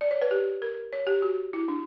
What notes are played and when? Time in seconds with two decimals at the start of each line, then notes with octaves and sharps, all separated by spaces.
0.01 D5
0.11 C#5
0.22 B4
0.31 G4
0.62 A#4
0.93 C#5
1.07 G4
1.22 F#4
1.53 E4
1.68 D4